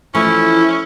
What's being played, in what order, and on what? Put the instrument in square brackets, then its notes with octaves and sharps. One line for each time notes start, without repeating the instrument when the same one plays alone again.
[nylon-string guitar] E3 F3 A3 [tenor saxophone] C#4 [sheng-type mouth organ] E4